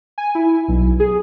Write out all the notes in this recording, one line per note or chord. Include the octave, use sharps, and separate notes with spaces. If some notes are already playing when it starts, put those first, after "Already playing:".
G#5
E4
B1
G#4